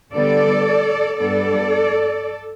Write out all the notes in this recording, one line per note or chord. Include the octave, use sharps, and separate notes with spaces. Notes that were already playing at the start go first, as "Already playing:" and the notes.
D3 G3 B3 A4 D5
G2 G3 B3 D4 A4 D5